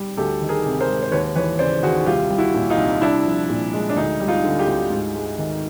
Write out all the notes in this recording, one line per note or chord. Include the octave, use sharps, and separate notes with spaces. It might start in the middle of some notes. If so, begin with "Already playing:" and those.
Already playing: G3
D2 G4 A4
D#3
G#4 A#4
C3
A#4 C5
G#3
C5
D#2 B4 C#5
E3 B4 C#5
C#3 C5 D5
D#2 F#4 G#4
C2 F4 G4
G3
E4 F#4
A#2
D#4 F4
C2
C2 D4 E4
F3
A#2
G#3
D4
D2 D#4
G3
D#4 F4
D3
F4 G4
D2
G#2
G#3
D#3